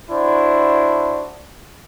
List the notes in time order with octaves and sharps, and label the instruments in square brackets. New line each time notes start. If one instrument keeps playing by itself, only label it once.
[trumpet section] D4 E4 F#4 C5